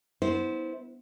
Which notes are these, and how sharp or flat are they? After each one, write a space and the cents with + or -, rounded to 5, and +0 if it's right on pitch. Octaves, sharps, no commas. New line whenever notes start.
B3 +0 E4 -30 C5 +0